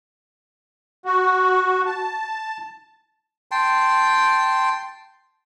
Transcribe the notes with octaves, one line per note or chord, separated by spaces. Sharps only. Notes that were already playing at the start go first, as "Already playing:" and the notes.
F#4
A5
G5 A5 C6